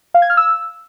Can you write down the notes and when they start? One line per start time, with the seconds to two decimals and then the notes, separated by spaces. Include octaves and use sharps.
0.14 F5
0.22 G#6
0.30 F6
0.37 E6